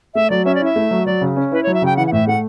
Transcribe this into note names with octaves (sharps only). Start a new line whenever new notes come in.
A3 E5
F#3 D5
C#4 E5
D5
E4 E5
A3
F#3
F#3 D5
C#3
C#4
E4 B4
F#3 C#5
E5
C#3 G5
E3 F#5
F#5
A2 E5
A3 F#5